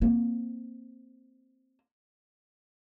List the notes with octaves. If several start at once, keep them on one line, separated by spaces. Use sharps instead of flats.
A#3 C4